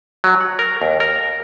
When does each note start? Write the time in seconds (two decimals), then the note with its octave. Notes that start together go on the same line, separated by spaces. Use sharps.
0.24 F#3
0.41 F#5
0.59 A#4
0.82 D#2
1.00 A#4